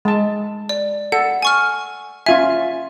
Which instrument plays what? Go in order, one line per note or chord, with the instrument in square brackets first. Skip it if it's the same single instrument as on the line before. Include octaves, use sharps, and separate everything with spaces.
[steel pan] G#3 A5
[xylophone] D5
[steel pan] A4 [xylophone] F#5
[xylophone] G#5 C#6 F6
[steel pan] C#4 F4 G#5 [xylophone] E5